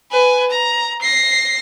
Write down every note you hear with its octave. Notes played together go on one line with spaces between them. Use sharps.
B4 G#5
A#5
A#6 C7